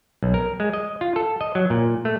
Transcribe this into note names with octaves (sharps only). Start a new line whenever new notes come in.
B1
A#4
G#3
D#5
F4
A4
D#5
F#3
A#2
A3